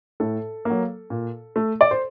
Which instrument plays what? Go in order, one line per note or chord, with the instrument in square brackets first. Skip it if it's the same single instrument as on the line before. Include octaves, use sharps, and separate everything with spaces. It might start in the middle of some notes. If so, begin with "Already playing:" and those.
[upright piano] A2 A4
F#3 A#3
A#2
A3
D5
C5